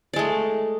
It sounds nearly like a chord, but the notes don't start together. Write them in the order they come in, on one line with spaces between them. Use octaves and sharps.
D5 G#3 A3